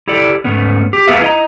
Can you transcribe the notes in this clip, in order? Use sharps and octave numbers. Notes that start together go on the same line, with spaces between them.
E4 G4 A4 D5
G#2 A3 B3 C#4
G4
B3 G#4 B4 E5 F5
E4 D#5 A#5